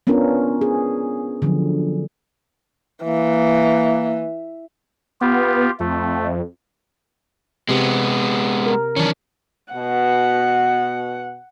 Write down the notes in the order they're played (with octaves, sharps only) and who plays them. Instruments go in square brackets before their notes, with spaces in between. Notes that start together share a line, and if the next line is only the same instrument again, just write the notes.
[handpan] B3 C#4 D4 F4 A#4
G#4
D3 F3 F#3
[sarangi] E3 [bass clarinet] A#3
[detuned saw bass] B3 [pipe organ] F4 G4
[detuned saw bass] F2 [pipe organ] A3
[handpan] C3 C4 G4 [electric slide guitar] G#3 B3
[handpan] A#4
[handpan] D#3 E3 F#3 [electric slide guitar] C#4 D4
[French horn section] B2 [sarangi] F#5